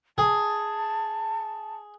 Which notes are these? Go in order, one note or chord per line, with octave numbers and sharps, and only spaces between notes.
G#4 A5